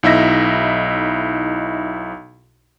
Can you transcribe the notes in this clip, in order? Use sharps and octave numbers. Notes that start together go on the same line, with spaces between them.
B1 D#4 E4 E5 A#6